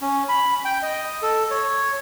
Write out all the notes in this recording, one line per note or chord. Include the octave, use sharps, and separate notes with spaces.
C#4
B5
G5
D#5
A4
C#5